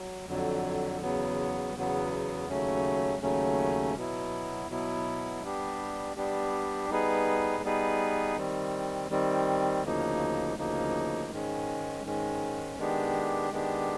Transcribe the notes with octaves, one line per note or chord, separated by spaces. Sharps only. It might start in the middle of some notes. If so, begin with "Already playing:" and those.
Already playing: F#3
F2 D3 F#3
E2 C#3 F#3 B3
E2 C#3 F#3 B3
D#2 C#3 F#3 A3 C#4
D#2 C#3 F#3 A3 C#4
B2 F#3 B3 E4
B2 F#3 B3 E4
G3 B3 D4 G4
G3 B3 D4 G4
G3 B3 D#4 G#4 B4
G3 B3 D#4 G#4 B4
D#3 G3 C4
D#3 G3 C4
D2 C#3 F3 A#3 D#4
D2 C#3 F3 A#3 D#4
G#2 D#3 G#3 C#4
G#2 D#3 G#3 C#4
D#3 G#3 B3 D4 G4
D#3 G#3 B3 D4 G4